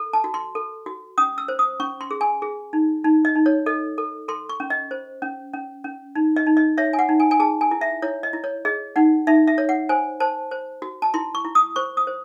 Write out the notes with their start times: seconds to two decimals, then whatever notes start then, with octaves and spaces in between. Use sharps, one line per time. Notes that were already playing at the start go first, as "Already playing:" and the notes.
Already playing: A4
0.13 A5
0.24 F#4
0.34 C6
0.55 A4
0.86 F#4
1.18 C#4 D#6
1.38 E6
1.48 C5
1.59 D#6
1.80 C#4 C#6
2.01 C6
2.11 G#4
2.21 G#5
2.42 G#4
2.73 D#4
3.04 D#4
3.25 D#5
3.35 D#4
3.46 C#5
3.66 A4 D#5
3.98 A4
4.28 A4 C6
4.49 C#6
4.60 C#4
4.70 D#5
4.91 C5
5.22 C#4
5.53 C#4
5.84 C#4
6.15 D#4
6.36 D#5
6.46 D#4
6.57 D#5
6.78 C#5 E5
6.93 G#5
6.99 F#5
7.09 D#4
7.20 G#5
7.31 G#5
7.40 G#4 A5
7.61 G#5
7.71 E4
7.81 E5
8.02 E4 C#5
8.23 D#5
8.33 E4
8.44 C#5
8.65 G#4 D#5
8.96 D#4 F#5
9.27 D#4 E5
9.47 E5
9.58 C#5
9.69 F#5
9.89 C5 G#5
10.20 C5 A5
10.51 C5
10.82 F#4
11.02 A5
11.14 E4 C6
11.35 C#6
11.45 E4
11.55 D#6
11.76 C5 C#6
11.97 D#6
12.07 C5